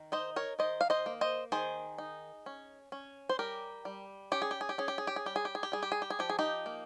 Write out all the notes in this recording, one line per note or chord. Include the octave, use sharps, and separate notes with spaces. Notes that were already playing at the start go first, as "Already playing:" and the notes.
Already playing: D#3
D#4 C5 D#5
A#4 C#5
D#3 C5 D#5
F5
C5 D#5
A#3
C5 D#5
D#3 G#4 C5
D#4
C#4
C#4
C5
G3 G4 A#4
G3
C#4 G4
G#4
G4
G#4
G4
C#4 G#4
G4
G#4
G4
G#4
G3 G4
G#4
G4
G#4
G4
G3 G#4
G4
G#4
G4
G#4
F3 G4
G#4
D#4 G4
A#3